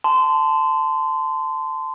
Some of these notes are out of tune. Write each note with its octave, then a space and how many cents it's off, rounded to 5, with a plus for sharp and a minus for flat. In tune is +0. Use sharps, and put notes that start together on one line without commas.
A5 +0 C6 -25